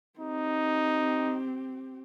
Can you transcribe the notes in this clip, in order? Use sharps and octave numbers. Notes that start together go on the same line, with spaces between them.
C4 D#4 G4